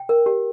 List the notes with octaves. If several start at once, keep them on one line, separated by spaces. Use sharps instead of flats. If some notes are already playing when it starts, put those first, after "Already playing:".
Already playing: G5
A#4
G4